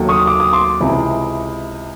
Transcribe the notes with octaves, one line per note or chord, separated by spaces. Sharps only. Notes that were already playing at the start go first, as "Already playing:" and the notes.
Already playing: D#2 D#3 F#3 A3
C#6 D#6
D6
D#6
C6 D6
C#2 C3 E3